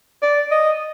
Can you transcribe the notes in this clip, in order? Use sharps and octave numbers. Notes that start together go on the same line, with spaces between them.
D5
D#5